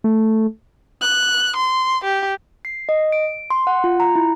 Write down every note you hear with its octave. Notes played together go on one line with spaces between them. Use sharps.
A3
F#6
C6
G4
C7
D#5
D7
C6
F#5
F4
A#5
E4